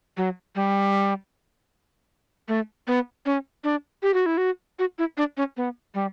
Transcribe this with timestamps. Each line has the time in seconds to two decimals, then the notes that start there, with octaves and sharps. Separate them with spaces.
0.17 F#3
0.55 G3
2.48 A3
2.87 B3
3.26 C#4
3.64 D4
4.03 G4
4.14 F#4
4.26 E4
4.38 F#4
4.79 F#4
4.99 E4
5.17 D4
5.37 C#4
5.57 B3
5.94 G3